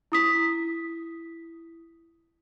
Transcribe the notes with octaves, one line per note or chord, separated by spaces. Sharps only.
E4 D#6 B6